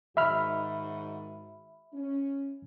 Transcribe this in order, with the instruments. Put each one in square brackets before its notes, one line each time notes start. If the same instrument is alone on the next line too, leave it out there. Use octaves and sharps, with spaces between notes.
[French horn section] G#2 D#3 F#4 [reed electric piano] E5 B5 F6
[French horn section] C#4